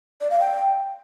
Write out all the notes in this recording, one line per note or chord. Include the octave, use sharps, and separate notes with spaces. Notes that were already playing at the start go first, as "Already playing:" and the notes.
D5
F5
G5